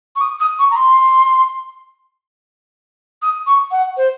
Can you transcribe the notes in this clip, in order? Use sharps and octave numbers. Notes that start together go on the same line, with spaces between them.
C#6
D#6
D#6
C#6
A#5
C6
D#6
C#6
F#5
C5